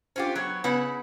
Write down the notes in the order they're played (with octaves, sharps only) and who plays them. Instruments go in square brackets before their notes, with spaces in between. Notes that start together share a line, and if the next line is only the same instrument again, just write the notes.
[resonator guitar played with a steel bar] C#4 F4 G4 [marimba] C5 F#5 D6
[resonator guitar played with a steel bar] F#3 B3 C#5
[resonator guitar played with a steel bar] C#3 E4 F#5 [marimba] B3 B4 C#5